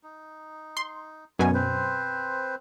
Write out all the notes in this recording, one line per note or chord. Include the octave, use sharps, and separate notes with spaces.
D#4
C6
F#2 B2 C#4 C#5 G#5
C4 B4 C5